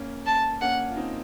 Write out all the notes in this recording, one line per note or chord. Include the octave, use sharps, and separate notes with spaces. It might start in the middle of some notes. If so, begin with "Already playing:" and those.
Already playing: A#3 C#4
A5
A#3 C#4 F#5
F4
C4 D#4